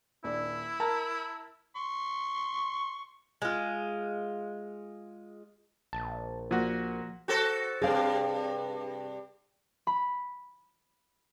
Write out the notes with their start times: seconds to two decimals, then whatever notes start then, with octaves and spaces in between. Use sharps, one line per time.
0.24 D#1 D4 E4
0.80 A#4 A5 A#5
1.76 C6 C#6
3.42 G#3 F4
5.93 A#1 A5
6.51 A#2 F3 F#4
7.28 F#4 A4 C5
7.82 G2 C3 G#4 F5
9.87 B5